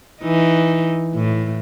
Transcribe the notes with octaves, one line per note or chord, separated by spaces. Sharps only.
E3 D#4
A2